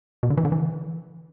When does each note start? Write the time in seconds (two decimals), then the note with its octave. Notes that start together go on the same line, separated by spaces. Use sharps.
0.23 B2
0.30 D3
0.37 E3
0.45 D3
0.52 E3